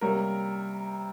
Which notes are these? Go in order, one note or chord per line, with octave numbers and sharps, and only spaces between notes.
C3 G3 A#3 C#4 A#4